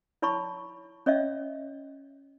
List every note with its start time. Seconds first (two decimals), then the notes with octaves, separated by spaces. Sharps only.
0.22 E4 C#5 A5 B5 C#6
1.06 C#4 C#5 D#5 E5